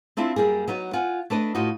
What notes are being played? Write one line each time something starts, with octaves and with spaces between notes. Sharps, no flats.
C4 D4 E4 F4 E5
F#2 G3 A#3 G#4
F#3 B3 D#4 F#4
F4 F#5 G#5
A3 D4 B4 D#5
A2 D#4 F4 F#4